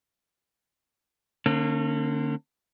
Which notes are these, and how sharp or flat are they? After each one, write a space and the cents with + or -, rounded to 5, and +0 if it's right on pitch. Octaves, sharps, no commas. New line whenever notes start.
D3 +20 A#3 -30 C#4 -35